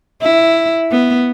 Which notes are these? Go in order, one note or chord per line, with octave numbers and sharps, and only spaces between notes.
E4
B3